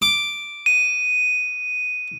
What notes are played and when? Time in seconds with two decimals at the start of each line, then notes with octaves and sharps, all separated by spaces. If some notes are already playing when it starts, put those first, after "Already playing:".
0.02 D6
0.66 D#7